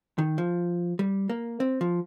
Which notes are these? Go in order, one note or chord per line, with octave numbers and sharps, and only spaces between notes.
D#3
F3
G3
A#3
C4
F3